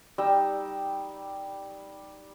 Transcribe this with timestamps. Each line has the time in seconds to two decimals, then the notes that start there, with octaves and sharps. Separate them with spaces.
0.18 G3 D#4 E6